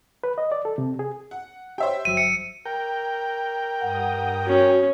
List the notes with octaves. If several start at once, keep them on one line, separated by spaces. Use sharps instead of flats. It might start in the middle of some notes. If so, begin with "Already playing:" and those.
B4
D#5
D5
A4
C3
G#4
F#5
G4 C5 C#5 E5 G5
G1 F#3 E6 D#7
C#7
A#4 G5
G2 F#5 D#6
C#4 F#4